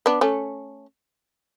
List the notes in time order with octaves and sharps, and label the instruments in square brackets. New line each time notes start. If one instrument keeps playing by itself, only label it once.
[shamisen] B3 D4
A3 C#4